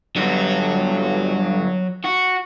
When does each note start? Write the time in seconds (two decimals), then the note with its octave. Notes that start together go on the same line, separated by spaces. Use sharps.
0.16 G2 D3 F#3 F#4
2.04 F#4